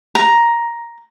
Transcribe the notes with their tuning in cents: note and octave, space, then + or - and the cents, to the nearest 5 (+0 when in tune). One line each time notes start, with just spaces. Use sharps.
A#5 +10